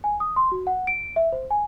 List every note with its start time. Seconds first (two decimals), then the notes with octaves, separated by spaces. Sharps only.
0.04 G#5
0.20 D#6
0.36 C6
0.52 F#4
0.67 F#5
0.87 D7
1.16 E5
1.32 C5
1.51 G#5